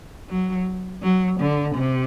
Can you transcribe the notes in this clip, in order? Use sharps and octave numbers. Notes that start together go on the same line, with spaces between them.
F#3
F#3
D3
C3